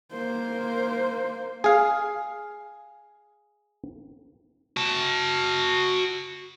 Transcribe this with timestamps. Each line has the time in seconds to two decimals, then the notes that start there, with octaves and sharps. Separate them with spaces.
0.12 A#3 C5
1.64 G#4 F5
4.77 F#4 A5